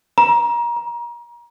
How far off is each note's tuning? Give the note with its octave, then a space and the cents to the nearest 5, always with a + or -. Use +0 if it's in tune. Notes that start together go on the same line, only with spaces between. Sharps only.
A#5 +30
A#5 +35